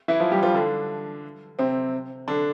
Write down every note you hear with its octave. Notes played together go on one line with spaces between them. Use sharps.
E3 E4
F3 F4
G3 G4
F3 F4
D3 D4
C3 C4
D3 D4